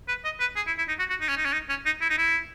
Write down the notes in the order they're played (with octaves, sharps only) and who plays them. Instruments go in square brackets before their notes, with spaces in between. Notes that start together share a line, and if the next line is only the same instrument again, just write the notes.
[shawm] B4
D#5
B4
G#4
E4
E4
D#4
F#4
F#4
D#4
C#4
D#4
C#4
D#4
C#4
D#4
E4
D#4
E4